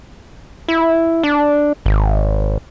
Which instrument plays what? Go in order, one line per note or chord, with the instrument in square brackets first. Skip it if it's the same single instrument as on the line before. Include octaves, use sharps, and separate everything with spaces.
[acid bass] E4
D4
G#1